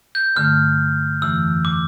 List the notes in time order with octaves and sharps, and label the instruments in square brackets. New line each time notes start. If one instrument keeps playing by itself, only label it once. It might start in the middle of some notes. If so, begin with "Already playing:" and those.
[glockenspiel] G6
[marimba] G2 D3 A3 [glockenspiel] F6
[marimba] F2 E3 A3 [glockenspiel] E6
[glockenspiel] D6